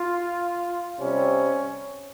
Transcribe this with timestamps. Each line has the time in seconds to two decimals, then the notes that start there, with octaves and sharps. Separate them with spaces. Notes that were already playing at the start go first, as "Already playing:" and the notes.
Already playing: F4
1.00 C3 G3 C4 C#4